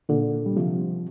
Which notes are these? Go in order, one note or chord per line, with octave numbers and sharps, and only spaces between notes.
A#2 D3
G3
C3 F3